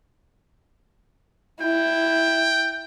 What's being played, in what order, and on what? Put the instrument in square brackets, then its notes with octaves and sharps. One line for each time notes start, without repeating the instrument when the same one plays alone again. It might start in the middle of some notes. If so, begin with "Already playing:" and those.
[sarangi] E4 [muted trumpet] G5